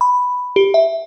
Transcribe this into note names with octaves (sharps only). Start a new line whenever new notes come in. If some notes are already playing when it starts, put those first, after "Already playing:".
B5
G4
E5